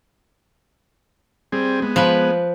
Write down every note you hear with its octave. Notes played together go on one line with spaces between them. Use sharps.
G3 C4 G#4
G#3 B3
F3 B4